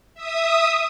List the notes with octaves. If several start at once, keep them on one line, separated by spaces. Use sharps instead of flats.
E5 D#6